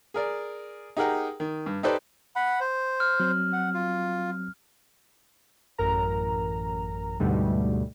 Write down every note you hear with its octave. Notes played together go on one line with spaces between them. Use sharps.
G#4 A#4 D5
D#4 G4 G#4 A#4 F#5 G5
D#3
G2
D#4 G4 A4 B4 C5 D5
F#5 B5
C5
F6
F#3 C4
F#5
F4
A1 F#2 A#4 A#5
D2 G#2 B2 D3 G3 A3